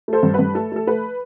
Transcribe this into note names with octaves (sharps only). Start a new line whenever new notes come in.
A3 A4 C5
G2
G2 B4
A3 A4
A3 A4
A3 B4